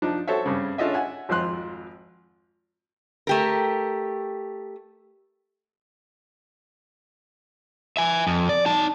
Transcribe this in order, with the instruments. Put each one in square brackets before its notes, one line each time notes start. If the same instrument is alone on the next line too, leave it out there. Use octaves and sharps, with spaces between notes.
[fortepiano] F3 D4 D#4
F#4 A4 C5 C#5 E5
G2 C#3 C4
C#4 D4 F4 A4 D#5 E5
E5 F#5 G#5
G#1 F2 F4 C5 C6 F#6
[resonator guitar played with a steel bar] A3 G4 A#4
[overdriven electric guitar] E5 G#5
F2
D5
D#4 A5